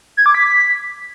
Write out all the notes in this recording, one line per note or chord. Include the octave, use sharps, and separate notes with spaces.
G#6
D6
B6